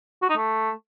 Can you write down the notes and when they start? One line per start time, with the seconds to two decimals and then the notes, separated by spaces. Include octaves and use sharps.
0.22 F#4
0.29 D#4
0.37 A3